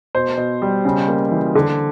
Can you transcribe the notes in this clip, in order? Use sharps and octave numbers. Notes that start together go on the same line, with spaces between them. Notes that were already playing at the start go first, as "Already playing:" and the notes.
B2 C5
B2
G3
C#3
A#3
E3
D3